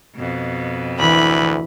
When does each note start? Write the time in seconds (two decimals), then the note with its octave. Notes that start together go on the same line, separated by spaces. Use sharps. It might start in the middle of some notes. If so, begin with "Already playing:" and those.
0.16 F2 B2
0.99 D2 E3 B5